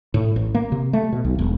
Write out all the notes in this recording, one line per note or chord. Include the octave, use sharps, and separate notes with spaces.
A2
A1
A#3
C3
A3
B2
B1
E1